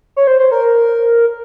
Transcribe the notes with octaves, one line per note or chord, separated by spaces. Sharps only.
C#5
C5
C5
A#4